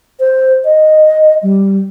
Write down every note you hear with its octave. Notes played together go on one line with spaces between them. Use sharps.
C5
D#5
G3